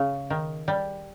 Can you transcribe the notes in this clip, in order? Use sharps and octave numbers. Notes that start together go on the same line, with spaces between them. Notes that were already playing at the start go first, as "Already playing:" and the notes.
Already playing: C#3
D#3
G3